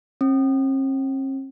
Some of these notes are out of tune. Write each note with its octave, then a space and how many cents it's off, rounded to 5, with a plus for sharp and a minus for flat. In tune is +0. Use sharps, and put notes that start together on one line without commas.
C4 +45